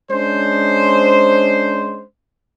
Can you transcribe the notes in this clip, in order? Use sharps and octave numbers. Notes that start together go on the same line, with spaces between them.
G#3 C#4 D4 C5